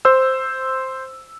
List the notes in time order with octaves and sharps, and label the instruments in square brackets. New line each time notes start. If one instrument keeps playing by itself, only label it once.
[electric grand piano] C5 E6